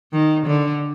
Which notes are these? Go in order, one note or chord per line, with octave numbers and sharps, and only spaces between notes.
D#3
D3